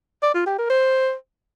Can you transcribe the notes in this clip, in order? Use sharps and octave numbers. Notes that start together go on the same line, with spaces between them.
D5
F4
G4
A#4
C5